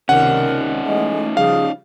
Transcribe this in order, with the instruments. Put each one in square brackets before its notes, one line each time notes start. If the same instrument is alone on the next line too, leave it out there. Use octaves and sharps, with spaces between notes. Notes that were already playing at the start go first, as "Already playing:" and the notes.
[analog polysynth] C#2 C3 D#3 [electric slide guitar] C#4 D#4 [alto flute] A#4 [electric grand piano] F#5
[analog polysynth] E3 A3 [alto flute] G#3
[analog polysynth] C#3 F3 G3 [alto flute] G#4 [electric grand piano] F5